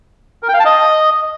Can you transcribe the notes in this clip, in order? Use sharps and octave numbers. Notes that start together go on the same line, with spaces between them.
A#4
G5
F5
A5
D#5